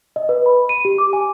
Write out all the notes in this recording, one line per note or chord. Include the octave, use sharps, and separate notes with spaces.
D#5
B4
B5
D#7
G4
D6
G#5